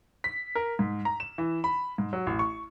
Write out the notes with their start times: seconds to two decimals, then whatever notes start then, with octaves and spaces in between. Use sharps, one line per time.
0.24 B6
0.55 A#4
0.79 G#2
1.05 A#5
1.20 E7
1.38 E3
1.64 B5
1.98 G#2
2.13 F#3
2.27 A1
2.39 C#6